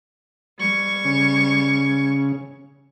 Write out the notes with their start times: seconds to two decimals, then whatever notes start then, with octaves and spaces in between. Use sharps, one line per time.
0.58 G3 C#6 G#6
1.05 C#3